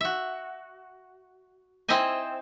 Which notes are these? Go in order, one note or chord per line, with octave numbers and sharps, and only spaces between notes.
F#4 E5
C4 E4 C5 D#5 G#5